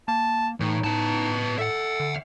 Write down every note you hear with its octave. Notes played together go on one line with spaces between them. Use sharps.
A#3 A5
A2 E3 D#4
A2 B3 A5
A4 E5 F#5
D3